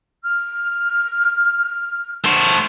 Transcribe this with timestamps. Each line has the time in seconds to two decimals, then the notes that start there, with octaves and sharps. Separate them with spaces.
0.24 F6
2.24 A3 C5